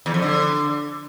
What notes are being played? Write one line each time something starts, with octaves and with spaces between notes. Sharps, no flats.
E2
F2
D3